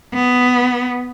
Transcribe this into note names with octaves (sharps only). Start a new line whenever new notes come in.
B3